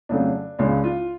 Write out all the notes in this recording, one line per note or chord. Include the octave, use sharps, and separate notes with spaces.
F2 C#3 F#3 A3 D4
C#2 C#3 G#3 D4
F4